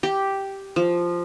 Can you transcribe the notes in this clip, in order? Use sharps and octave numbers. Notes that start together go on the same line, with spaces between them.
G4
F3